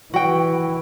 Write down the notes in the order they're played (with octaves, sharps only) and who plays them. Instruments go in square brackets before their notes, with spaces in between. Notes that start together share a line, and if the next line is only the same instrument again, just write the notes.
[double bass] E3 [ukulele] F#4 G5